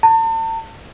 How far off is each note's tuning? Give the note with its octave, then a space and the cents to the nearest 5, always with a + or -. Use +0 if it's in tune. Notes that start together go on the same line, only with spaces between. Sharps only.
A5 +40